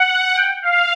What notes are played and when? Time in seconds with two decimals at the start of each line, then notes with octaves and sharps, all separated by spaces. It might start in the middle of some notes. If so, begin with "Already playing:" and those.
Already playing: F#5
0.35 G5
0.62 F5